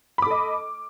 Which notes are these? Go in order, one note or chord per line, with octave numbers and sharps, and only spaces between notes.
A4 D#5 B5 D6